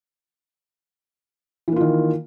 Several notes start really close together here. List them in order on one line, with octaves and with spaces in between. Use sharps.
E3 A#3 F4 D#3